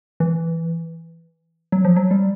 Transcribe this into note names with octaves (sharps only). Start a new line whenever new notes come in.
E3
F#3
F3
F#3
G3